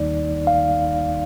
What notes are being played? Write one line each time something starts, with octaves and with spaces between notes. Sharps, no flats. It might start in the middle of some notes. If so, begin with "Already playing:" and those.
Already playing: D#2 D#3 G3 A#3 D#4 D5
F5